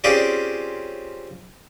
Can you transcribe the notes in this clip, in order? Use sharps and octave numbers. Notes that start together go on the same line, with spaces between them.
C4 C#4 F4 G4 G#4 D5